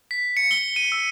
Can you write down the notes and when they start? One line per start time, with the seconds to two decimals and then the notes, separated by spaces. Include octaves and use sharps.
0.11 B6
0.37 C#7
0.51 G7
0.76 D#7
0.92 E6